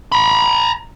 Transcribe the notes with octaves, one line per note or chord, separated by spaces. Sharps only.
A#5 B5